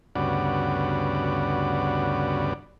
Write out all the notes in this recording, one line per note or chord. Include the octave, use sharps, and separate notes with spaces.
D2 G2 C#3 B3 F#4 D5